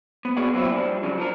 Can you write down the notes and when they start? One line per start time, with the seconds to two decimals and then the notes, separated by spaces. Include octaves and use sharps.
0.25 B3
0.37 B3 F#4 G#4 C#5 D5 F#5
0.53 F#2 A#2 F#3 C4 E4 F4
0.72 F3 G3 D4
1.03 C#3 F3 F#3
1.18 F3 D4 A#4